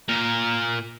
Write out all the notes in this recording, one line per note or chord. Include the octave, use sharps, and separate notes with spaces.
A#2 A#4